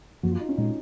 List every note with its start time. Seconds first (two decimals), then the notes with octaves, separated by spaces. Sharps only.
0.23 F#2 F3 A#3 F#4
0.32 F4
0.40 D#4
0.49 C#4
0.57 A#2 G#3 D#4